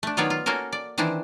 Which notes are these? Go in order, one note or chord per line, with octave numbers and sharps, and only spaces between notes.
A3 D4
D#3 F#3 B3 F4 C#5 D5
F4
A#3 C#4 F#4 A4 A#4
D5
D#3 E3 C4 D4 E4